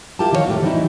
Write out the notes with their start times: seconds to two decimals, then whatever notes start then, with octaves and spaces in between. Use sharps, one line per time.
0.19 E4 F4 G4 A#4 A5
0.32 D#3 F3 E4 F#4 C#5 F5
0.47 F2 A2 A3 G4
0.63 E3 F#3 G3 C4 D#4 E4